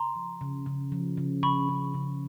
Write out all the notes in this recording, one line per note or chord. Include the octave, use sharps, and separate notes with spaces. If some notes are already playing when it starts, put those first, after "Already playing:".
Already playing: C#3 A#5 C6
F3
C#3
C#3
F3
C#3
C#3 B5 C#6
C#3
C#3